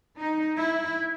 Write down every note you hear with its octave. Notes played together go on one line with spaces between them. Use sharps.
D#4
E4